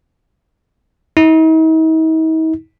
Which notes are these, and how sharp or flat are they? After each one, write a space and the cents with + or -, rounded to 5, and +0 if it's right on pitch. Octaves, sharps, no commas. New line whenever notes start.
D#4 +45